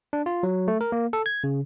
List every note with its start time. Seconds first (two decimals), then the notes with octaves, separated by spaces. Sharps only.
0.13 D4
0.26 F4
0.43 F#3
0.68 A3
0.81 A#4
0.92 A#3
1.13 A4
1.26 G#6
1.44 C#3